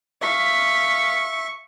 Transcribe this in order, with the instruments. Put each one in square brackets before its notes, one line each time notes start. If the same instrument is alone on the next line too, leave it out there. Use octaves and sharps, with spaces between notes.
[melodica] E5 [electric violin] F5 B6 [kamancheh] C#6